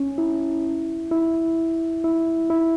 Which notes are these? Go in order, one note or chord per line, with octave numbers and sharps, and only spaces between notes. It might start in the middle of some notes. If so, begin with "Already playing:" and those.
Already playing: C#4
E4
E4
E4
E4